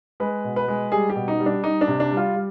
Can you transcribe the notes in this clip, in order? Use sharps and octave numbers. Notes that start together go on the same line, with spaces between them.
G#3 B4
B2
B4
G#3
G3 G#4
G4
B2
D#4
G3
D4
G3 D#4
D4
C3
D4
G3
F4
G3